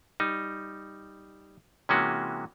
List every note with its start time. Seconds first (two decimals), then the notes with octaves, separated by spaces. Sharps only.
0.20 G3 D#4
1.89 C3 E3 G#3 A#3 C#4 F#4